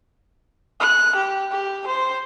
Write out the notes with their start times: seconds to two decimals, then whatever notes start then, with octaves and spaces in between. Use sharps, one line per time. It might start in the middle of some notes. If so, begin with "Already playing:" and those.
0.80 F#6
1.16 G4
1.51 G4
1.87 C5